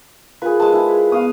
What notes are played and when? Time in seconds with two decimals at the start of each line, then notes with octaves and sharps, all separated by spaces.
0.42 F4 G#4 A#4 B4 F5
0.60 G#3 A5
0.72 E4 G#4
1.12 B3 F5 D#6